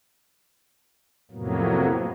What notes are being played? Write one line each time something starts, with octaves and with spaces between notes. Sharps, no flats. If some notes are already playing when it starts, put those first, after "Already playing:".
F2 A2 C3 F#3 A#3 B3